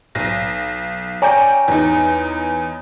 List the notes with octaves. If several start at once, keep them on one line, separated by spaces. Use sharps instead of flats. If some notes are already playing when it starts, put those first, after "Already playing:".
B1 A#6
C#5 D5 G5 G#5 A#5
E2 D#4